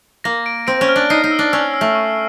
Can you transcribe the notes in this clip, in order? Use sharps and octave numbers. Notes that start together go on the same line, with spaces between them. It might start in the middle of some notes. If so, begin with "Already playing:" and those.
A#3 A#6
D7
C4 D7
C#4
F6
D4
D#4 C7
D#4
E6
D4
C#4 E6
E6
A3
C#6